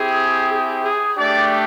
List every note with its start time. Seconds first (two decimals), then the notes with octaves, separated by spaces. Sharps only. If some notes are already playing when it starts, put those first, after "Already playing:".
Already playing: C4 E4 G4 G#4
0.51 G#4
0.84 G#4
1.16 A3 D4 G4 D5